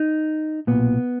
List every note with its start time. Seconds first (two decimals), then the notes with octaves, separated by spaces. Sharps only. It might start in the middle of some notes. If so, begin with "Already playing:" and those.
Already playing: D#4
0.67 B1 A#2 B3